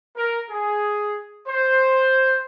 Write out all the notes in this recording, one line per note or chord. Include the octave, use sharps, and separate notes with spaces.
A#4
G#4
C5